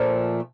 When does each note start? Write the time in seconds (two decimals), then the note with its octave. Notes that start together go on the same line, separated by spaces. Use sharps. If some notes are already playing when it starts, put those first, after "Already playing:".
Already playing: A#2 F3 A3